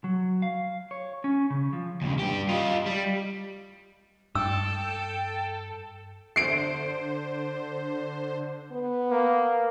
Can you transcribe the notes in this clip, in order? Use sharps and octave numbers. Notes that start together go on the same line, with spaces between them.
F#3
F5
C#5
C#4
C#3
F3
D#2 C#3
G2 G4
F4 D#5
G3
G2 A4 G5 E6
D3 C5 C7 D7
B3
A#3